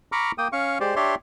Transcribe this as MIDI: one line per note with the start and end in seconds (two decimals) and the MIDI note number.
0.12 0.32 82
0.12 0.32 83
0.12 0.32 85
0.12 0.32 86
0.12 0.32 89
0.38 0.48 58
0.38 0.48 79
0.38 0.48 87
0.53 0.78 61
0.53 0.78 77
0.53 0.78 85
0.81 0.96 56
0.81 0.96 67
0.81 0.96 72
0.81 0.96 74
0.96 1.15 62
0.96 1.15 67
0.96 1.15 73
0.96 1.15 74
0.96 1.15 76
0.96 1.15 84